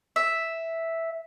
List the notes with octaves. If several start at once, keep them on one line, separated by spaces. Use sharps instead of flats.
E5